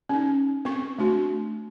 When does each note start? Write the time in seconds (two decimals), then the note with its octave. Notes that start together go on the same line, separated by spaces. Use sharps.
0.09 C#4 D#4
0.65 C4 C#6
0.99 A3 D4 F#4